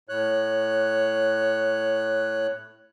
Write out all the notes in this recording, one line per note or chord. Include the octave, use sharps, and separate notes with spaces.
A2 C#5 F#6